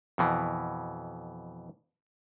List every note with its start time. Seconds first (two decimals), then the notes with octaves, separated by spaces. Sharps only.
0.18 F2 B2 E3